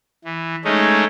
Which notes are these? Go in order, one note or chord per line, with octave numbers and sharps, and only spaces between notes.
E3
G#3 A3 C#4 D#4